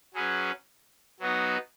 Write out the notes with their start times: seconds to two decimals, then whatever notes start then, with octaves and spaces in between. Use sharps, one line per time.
0.14 F#3 C#4 G#4 B4
1.20 F#3 B3 D#4 F#4